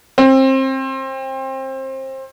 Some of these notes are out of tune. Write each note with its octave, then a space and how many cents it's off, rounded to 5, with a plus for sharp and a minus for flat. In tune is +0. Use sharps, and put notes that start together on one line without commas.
C4 +25